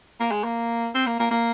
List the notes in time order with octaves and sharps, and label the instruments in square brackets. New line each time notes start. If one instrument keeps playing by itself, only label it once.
[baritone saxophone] A#3
G#3
A#3
C4
A#3
A#3
A#3